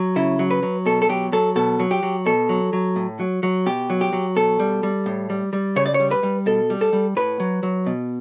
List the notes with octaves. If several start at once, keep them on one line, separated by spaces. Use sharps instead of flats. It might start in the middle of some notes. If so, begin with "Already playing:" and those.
Already playing: F#3
C#3 E4
F#3
B4
F#3
B2 A4
A4
F#3 G4
F#3 A4
B2 A4
F#3
G4
F#3
B2 A4
F#3
F#3
A2
F#3
F#3
B2 G4
F#3
G4
F#3
B2 A4
G3
G3
A2
G3
G3
C#3 C#5
D5
C#5
G3
B4
G3
B2 A4
G3
A4
G3
A2 B4
F#3
F#3
B2